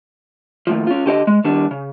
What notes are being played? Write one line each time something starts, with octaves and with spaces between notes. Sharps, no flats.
D#2 A2 F3
C#4 F4
D3 G4 C#5 D#5
G#3
D#3 G3 D4
C#3